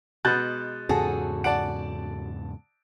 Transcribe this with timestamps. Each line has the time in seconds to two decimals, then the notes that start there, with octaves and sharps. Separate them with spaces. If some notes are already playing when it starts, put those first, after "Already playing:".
0.25 B2 G#3 B3 F#6 G6 A6
0.89 E2 G#2 C#3 F#4 G#4 A4
1.44 D5 F#5 A5 D7